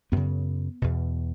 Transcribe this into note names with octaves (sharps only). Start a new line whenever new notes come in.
F#2 C#3 B3
E2 B2